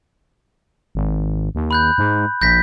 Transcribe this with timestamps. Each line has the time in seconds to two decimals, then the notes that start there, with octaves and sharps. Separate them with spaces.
0.95 G#1
1.55 D#2
1.71 B5 F#6 G6
1.98 G#2
2.42 A#1 G6 A#6 B6